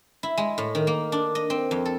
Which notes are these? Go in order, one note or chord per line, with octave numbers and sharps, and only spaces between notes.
E4
G#3
A2
D#3
A#3
D4
D#5
C4
F2
A4